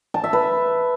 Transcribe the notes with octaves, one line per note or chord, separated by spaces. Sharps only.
A5
E5
B4